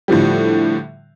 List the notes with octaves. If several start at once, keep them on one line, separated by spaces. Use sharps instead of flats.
A2 D3 F3 G3